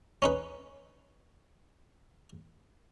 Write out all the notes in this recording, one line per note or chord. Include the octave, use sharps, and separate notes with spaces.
C#4 D#4 B4